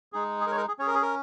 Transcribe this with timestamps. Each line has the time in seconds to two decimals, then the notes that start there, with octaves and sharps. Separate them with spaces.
0.13 G#3 D#4 G#4
0.41 G#4
0.47 A#4
0.51 C#5
0.57 A#4
0.68 G#4
0.79 C#4 G#4 C#5
0.87 A#4
0.95 G#4
1.02 A#4